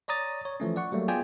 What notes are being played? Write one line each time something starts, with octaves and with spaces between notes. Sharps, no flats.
C#5 D5 A#5 D#6 A6
C#5
E3 F3 A3 C#4
D5 F#5 C#6
F#3 G3 A3 A#3
B3 F4 G#4 D5 G5 G#5